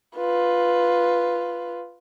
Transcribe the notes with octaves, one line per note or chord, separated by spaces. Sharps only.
F4 B4